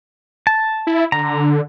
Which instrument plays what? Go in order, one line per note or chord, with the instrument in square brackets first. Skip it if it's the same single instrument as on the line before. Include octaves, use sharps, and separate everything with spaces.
[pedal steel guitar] A5
[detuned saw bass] E4
[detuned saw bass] D3 [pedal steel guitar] A#5